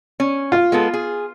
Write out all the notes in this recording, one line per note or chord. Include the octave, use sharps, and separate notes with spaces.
C#4
F4
G#3 B3 A4
G#4